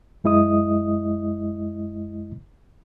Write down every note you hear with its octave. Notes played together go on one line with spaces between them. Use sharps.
F#2 G#3 E4 D#5 D#6